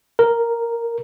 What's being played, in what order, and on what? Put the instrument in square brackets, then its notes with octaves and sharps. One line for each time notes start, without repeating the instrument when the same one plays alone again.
[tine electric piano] A#4